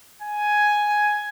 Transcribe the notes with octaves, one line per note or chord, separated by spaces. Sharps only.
G#5